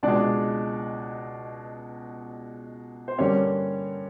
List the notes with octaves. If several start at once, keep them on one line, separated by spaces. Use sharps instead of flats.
C#2 B2 G#3 D4 D5
C5
G2 D3 G3 A#3 C#4 C#5